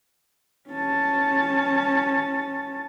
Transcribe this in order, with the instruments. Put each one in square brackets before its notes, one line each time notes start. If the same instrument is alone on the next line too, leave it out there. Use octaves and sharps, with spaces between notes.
[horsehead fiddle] C#4 A5